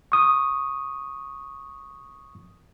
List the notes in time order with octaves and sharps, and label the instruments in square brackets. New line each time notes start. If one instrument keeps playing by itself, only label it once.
[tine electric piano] C#6 D#6